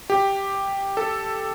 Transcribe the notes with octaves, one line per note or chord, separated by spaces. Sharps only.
G4
A4